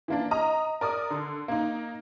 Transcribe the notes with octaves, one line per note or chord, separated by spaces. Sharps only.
E3 A#3 D4
D#5 A#5 D#6
A#4 D5 D6 D#6
D3
A#3 D#4